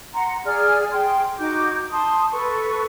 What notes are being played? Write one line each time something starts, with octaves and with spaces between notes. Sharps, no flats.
F#5 A#5 C6
G#4 D5 F6
G#4 G5 C6
D#4 F#4 D6 G6
A5 C6 D#6
A4 B4 C#6